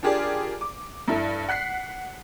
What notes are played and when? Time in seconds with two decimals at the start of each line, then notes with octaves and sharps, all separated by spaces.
0.03 D4 F4 G4 G#4 A#4 D5
0.61 D6
1.08 G2 E4 A4
1.48 F#5 F#6 B6 C7